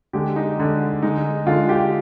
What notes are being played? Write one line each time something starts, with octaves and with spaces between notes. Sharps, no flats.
D3 G#3 G4
D#4
D3 G#3
D3 G#3 D#4
D3 G#3 F4
G4